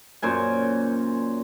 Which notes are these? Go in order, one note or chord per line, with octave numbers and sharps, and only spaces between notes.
F#2 A#2 C5 G#5